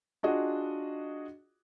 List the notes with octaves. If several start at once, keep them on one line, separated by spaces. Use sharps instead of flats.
D4 F4 F#4 G#4 D#5